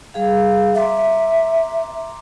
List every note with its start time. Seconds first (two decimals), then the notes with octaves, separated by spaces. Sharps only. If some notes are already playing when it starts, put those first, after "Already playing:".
0.14 G3 G#4 F5
0.75 E5 A#5 C6 D6